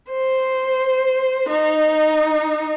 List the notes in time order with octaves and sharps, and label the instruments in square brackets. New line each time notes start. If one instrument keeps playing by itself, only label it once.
[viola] C5
D#4